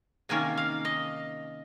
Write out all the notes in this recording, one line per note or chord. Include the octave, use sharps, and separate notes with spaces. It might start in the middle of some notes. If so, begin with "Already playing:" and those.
C3 D#3 A#3 C#4 G#5
F5
D#5